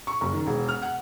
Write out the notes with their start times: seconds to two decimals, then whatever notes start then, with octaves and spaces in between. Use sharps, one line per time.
0.07 C#6
0.21 F#1
0.33 D#3
0.47 E1
0.69 F6
0.82 F#5